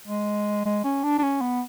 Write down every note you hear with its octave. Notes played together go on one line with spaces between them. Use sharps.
G#3
G#3
C#4
D4
D4
C#4
B3